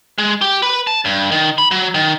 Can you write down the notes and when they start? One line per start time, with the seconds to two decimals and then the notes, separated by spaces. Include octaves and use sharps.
0.18 G#3
0.42 G4
0.62 B4
0.87 A5
1.05 G2
1.32 D#3
1.58 B5
1.71 F#3
1.94 D#3